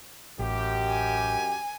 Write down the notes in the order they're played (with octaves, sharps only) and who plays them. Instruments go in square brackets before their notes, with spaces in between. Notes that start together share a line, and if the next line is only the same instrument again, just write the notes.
[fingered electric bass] A1 [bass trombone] F#2 [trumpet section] G4
[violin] G#5